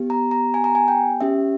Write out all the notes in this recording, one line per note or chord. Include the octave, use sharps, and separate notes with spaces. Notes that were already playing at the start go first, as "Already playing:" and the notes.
Already playing: B3 G4
A#5
A#5
G#5
A#5
G#5
G5
C#4 G4 E5